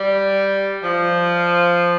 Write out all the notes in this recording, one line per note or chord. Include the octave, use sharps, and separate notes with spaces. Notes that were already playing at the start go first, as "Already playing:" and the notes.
Already playing: G3
F3